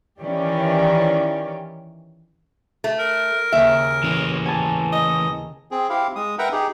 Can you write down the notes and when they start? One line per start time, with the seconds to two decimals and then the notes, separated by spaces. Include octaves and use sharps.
0.20 D#3 E3 C#4 G4 D5
2.84 A3
2.99 A#4
3.52 D#2 C#3 E5
4.04 E3 C#4
4.46 G#5 A5
4.92 D#5
5.71 C4 G#4
5.89 C4 E4 G4 F5
6.16 G#3 D#6
6.39 A#4 B4 E5 F#5 G5 A#5
6.52 D#4 G4 G#4